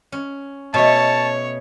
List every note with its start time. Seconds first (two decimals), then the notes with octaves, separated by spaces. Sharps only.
0.12 C#4
0.74 B2 A3 C#5 A5